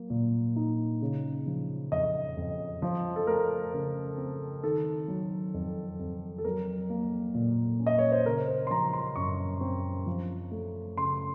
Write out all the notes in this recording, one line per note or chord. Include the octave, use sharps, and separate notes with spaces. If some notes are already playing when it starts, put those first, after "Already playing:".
Already playing: F#3 A#3
A#2
D#4
C#3
F3
F2 D#5
F2
F3
A4
A3 A#4
C#3 A#4
C4
D#3 A4
F#3
F2
F2
A4
F#3 A#4
A#3
A#2
C#4
D#5
C#5
C5
C#3 A#4
C5
C6
F3 A#5
C6
F#2 C#6
C4
F3
A3
C#3 C6